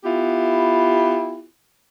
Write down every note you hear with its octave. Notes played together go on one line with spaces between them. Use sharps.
B3 E4 F4 G4